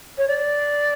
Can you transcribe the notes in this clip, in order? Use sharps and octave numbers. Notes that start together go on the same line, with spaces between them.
C#5
D5